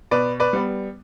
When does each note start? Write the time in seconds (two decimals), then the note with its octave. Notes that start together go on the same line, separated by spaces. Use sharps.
0.11 B2 B4 D5
0.40 B4 D5
0.53 G3 B3